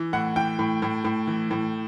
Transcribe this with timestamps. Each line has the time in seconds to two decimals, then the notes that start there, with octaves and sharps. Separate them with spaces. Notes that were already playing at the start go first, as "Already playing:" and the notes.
Already playing: E3
0.13 A2 F#5
0.36 E3 G5
0.59 A2
0.82 A2
1.04 A2
1.27 E3
1.51 A2